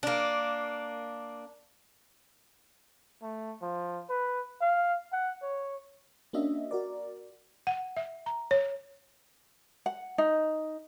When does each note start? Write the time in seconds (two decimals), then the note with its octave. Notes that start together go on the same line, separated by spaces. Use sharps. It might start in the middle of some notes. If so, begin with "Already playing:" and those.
0.03 A#3 D4
3.22 A3
3.62 F3
4.09 B4
4.61 F5
5.12 F#5
5.42 C#5
6.33 A#3 C#4 D4 F#4 D#5 E5
6.71 F#4 A#4 D5
7.67 F#5
7.97 E5
8.26 A#5
8.51 C#5
9.86 F#5
10.18 D#4